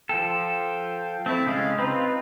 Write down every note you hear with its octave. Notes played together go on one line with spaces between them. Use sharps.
F3 A4 F5 G5
A3 C4 E4 E5 A5
C#3 G#3 C#4 G#4 F5
C4 D#4 F4 B4